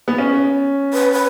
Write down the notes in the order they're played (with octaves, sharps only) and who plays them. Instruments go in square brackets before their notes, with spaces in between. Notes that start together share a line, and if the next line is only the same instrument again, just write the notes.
[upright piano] B3
C#4
[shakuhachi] B4
B4